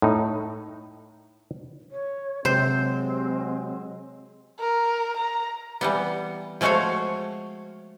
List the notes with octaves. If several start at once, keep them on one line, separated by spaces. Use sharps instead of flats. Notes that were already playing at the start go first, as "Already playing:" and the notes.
A2 D#4
C#5
C3 F#3 G#3 C4 C5
A#4
A#5
E3 G3 B3
F3 G#3 A3 F#4 C#5 F5